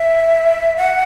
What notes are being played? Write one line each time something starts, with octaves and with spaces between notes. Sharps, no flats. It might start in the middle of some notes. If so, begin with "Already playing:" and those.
Already playing: E5
F#5